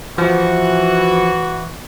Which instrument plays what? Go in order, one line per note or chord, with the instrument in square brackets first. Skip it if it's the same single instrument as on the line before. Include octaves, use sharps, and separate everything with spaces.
[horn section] E3 F#4 [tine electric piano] F3